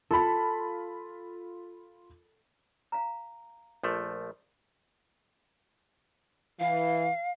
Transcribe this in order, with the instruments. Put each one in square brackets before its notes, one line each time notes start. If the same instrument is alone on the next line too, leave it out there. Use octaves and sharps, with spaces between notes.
[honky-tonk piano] F4 B5 [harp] A4
[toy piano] F5 A#5
[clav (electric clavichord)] A#1 F3 A3
[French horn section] E3 [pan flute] F5